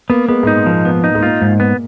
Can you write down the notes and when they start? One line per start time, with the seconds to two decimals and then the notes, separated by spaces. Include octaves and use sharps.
0.10 A#3 B3
0.29 G#3 B3
0.43 G#2
0.47 A#2 D#4
0.66 A#2 F3
0.85 B3
1.04 D#4
1.15 G#2
1.22 A#2 F4
1.42 G#2
1.52 A#2
1.60 B3